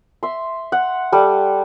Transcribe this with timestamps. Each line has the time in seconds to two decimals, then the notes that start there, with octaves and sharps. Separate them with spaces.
0.23 E5 C6
0.72 F#5
1.12 G3 A4